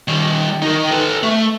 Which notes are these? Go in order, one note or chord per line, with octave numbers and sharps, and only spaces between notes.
D#3 G3
D#3 D#4
A4 B4
A3